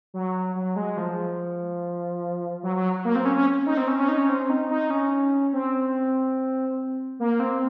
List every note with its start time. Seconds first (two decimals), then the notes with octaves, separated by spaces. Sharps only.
0.14 F#3
0.55 F#3
0.76 G#3
0.97 F3
2.63 F#3
2.76 F#3
3.05 A#3
3.15 C4
3.25 C#4
3.36 C#4
3.66 D#4
3.77 C4
3.88 C#4
3.98 C#4
4.08 D#4
4.18 C#4
4.29 C4
4.50 D#4
4.70 D#4
4.90 C#4
5.53 C4
7.20 A#3
7.40 C4